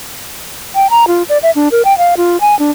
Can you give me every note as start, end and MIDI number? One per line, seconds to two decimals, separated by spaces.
0.75 0.90 79
0.90 1.08 82
1.08 1.23 65
1.29 1.38 74
1.43 1.51 76
1.56 1.68 62
1.72 1.82 70
1.85 1.96 79
1.98 2.15 77
2.17 2.40 65
2.41 2.58 80
2.59 2.71 62